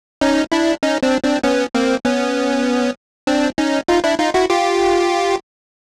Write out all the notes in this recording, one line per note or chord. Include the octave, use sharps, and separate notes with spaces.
C#4 D#4
D4 E4
C#4 D#4
C4 D4
C4 D4
B3 C#4
A#3 C4
B3 C#4
C4 D4
C#4 D#4
D#4 F4
D4 E4
D#4 F4
E4 F#4
F4 G4